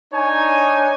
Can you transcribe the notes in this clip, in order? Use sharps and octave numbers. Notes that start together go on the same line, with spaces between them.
D4 D#4 C#5 G#5